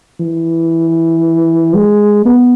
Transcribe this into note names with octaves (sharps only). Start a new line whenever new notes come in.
E3
G#3
B3